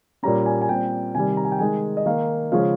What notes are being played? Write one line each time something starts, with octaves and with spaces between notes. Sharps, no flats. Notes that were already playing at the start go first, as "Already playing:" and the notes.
A#2 G3 C#4 A#5
G#5
G#5
A#2 G3 C4 G5
C3 D#3 G3 G#5
A#5
G#5
G5
D#3 G#3 D#4 G#5
D#5
D#3 A#3 D#4 F5
C#3 F3 G#3 C#4 F5